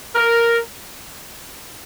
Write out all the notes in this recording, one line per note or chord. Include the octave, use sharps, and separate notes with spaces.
A#4